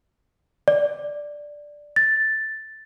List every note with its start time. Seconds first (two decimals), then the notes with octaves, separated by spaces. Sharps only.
0.68 D5
1.96 A6